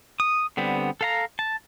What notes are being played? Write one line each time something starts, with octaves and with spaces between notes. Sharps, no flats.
D#6
D3 G3 B3 C4
A4 F5 A#5
A5